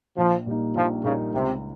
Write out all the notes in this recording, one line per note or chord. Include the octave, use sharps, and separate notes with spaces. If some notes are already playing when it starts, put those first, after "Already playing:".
A#1 F3
A#2 G3 A#3 D#4
A#1 F3
A#2 C#3 G3 A#3 D#4
C#2 C3